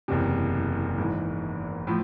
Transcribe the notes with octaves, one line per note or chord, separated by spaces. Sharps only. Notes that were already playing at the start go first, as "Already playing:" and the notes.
F#1 E2 C3
G#1 G#2 E3
A2 F3